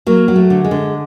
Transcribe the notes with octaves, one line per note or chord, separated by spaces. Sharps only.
F#3 A#3
F#3
A3
D3
G#3
D3